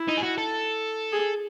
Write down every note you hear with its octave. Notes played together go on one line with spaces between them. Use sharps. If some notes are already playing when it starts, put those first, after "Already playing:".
Already playing: E4
D#4
G#4
F#4
A4
G#4